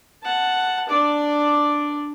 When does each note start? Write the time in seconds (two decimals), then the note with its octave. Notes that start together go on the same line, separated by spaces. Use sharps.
0.23 F#5 A5
0.89 D4 D5